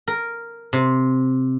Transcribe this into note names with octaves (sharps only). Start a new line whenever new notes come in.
A#4
C3